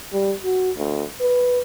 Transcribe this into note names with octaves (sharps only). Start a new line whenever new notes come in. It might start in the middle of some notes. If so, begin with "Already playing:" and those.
G3
F#4
D2
B4